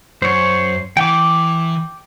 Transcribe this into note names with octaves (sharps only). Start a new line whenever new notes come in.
F#2 C5 C#5
E3 G5 D6